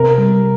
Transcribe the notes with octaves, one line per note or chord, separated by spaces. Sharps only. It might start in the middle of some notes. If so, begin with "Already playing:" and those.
Already playing: C3 A#4
G3